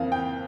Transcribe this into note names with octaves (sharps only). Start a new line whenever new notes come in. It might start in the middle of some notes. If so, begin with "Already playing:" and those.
Already playing: F2 E3 A#3 F5
G5